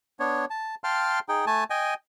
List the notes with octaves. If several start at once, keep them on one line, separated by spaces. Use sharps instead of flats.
B3 D4 C#5
A5
F5 G5 A5 C6 F6
D#4 G#4 G5
A3 G#5 A5
D#5 G5 G#5